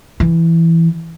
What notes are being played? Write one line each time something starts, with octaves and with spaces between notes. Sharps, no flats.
E3